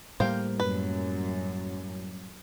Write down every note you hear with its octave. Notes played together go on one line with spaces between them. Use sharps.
A2 G3 A#3 C5 F5 G5
F#2 B4